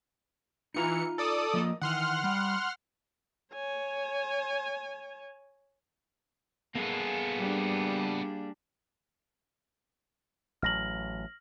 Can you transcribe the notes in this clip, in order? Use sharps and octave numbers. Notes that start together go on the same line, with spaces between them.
E3 D#4 F4 A#5 C#7
A4 D5 D#6
F3 A#3 D#5
D#3 E3 F#5 C6 F6
G3
C#5 G#5
A#3 B3 G#4 A4
G3 D4
A1 F#3 F6 A#6 F#7